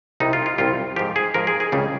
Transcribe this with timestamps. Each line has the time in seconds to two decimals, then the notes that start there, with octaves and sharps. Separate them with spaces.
0.20 C2 C3 G3 D#4
0.33 F4
0.46 F4
0.58 C2 C3 G3 F4
0.96 G#2 F3 G4
1.16 G#4
1.34 G#2 F3 A#4
1.47 G#4
1.60 G#4
1.72 C#2 C#3 G3